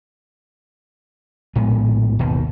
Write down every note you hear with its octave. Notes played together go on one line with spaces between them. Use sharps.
A#1 A2 G#3 B3
G#1 D#2 B2 D#3